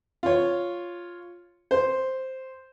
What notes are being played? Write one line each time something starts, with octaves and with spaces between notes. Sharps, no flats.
F4 C#5
C5